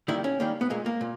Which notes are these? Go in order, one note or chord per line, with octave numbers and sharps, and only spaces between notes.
D#3 G3 A#3 E4
C#4
D#3 G3 A#3
B3
A#2 G#3 A#3
A#3
A#2